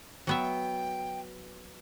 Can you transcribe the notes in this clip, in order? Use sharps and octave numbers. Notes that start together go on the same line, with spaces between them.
F#3 B3 E5 G5